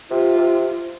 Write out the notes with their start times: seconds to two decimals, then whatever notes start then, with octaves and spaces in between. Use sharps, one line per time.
0.10 C3 F4
0.38 C3